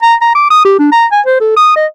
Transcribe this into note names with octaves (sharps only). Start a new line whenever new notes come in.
A#5
A#5
D6
D#6
G4
D4
A#5
G#5
C5
A4
D#6
D#5